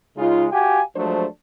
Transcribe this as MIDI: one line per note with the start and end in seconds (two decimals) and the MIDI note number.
0.18 0.46 49
0.18 0.46 56
0.18 0.46 63
0.18 0.46 65
0.52 0.82 66
0.52 0.82 67
0.52 0.82 77
0.52 0.82 79
0.52 0.82 80
0.96 1.26 53
0.96 1.26 54
0.96 1.26 56
0.96 1.26 57
0.96 1.26 62
0.96 1.26 72